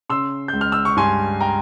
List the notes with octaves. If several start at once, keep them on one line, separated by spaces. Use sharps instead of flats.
C#3 C6 E6
C#2 G6
F6
E6
C#6
G2 G#5 C6
G5 A#5